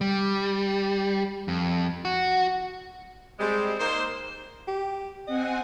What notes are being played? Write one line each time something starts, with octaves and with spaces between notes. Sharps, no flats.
G3
F2
F#4
G3 G#3 C4
A#3 D#4 C5
G4
C4 D#5 F#5 G#5